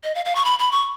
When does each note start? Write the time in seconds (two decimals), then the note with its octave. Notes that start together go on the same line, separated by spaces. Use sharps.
0.04 D#5
0.15 F5
0.25 F5
0.35 C#6
0.45 B5
0.59 B5
0.72 C#6